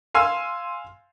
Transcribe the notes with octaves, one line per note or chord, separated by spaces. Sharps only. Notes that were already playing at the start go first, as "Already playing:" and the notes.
F5 G#5 C6 E6